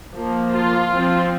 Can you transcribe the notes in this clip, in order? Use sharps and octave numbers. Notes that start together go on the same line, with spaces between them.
F3 A#3
F4
F3 C4